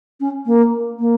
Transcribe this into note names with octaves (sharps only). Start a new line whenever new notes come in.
C#4
A#3
A#3